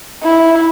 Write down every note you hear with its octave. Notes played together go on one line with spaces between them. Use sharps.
E4